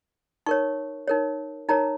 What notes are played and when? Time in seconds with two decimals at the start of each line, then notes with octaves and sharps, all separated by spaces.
0.46 D#4 A#4 C#5 C#6
1.08 D#4 A#4 C#5
1.69 D#4 A#4 C#5 A#5